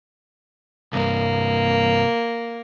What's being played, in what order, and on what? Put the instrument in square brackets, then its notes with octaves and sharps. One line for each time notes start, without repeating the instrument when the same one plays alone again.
[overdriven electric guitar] C2 G2 [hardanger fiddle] A#3